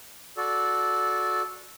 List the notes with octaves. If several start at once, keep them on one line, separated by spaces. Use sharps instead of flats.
F#4 A4 D5